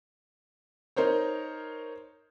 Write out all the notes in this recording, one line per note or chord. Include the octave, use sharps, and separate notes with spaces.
D#4 A#4 C5 C#5